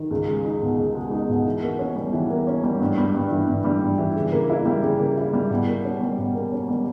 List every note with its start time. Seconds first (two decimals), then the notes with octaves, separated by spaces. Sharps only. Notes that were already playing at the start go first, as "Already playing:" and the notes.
Already playing: D#3
0.11 C#2
0.28 G#3
0.45 D#4
0.62 B2
0.79 C#2
0.95 G#3
1.11 D#4
1.29 B2
1.45 E3
1.62 A#3
1.79 C#4
1.96 G3
2.13 E3
2.30 A#3
2.47 C#4
2.63 G3
2.80 G2
2.98 G3
3.15 G2
3.31 E3
3.48 G2
3.65 G3
3.82 G2
3.98 E3
4.16 C#3
4.33 A#3
4.50 E4
4.65 G3
4.83 C#3
5.00 A#3
5.17 E4
5.33 G3
5.50 B2
5.67 A#3
5.84 C#4
6.01 G3
6.18 B2
6.34 A#3
6.52 C#4
6.68 G3